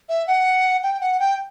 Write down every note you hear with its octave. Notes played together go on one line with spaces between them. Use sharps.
E5
F#5
G5
F#5
G5